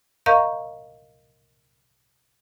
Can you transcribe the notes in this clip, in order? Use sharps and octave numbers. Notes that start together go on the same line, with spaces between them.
A#4 D#5 F5 A#5 C#6 G6